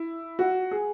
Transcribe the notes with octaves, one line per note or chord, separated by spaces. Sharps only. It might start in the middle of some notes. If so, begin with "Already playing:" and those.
Already playing: E4
F#4
G#4